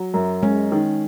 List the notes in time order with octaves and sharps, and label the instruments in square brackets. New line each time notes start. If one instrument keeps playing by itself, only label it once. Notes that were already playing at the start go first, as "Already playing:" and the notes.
Already playing: [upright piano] F#3
F#2
[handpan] G#3 [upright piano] C#4
[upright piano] D#3